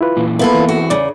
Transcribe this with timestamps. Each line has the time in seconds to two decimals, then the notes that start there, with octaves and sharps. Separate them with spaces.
0.01 E4 F4 B4
0.17 A#2 E3
0.39 A#3 B3 E4 F4 A4 B4
0.54 E3 C4
0.69 F#4
0.90 E2 C#3 D5